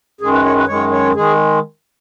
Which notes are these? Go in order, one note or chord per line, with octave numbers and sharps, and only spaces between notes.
F#2 D#3 G#3 G#4
B4
C#5
B4
F#2 D#3 G#3 C#5
C#5
D#3 G#3 G#4